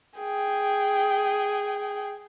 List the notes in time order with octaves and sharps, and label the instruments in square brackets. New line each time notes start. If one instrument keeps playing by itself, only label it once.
[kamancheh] G#4 G5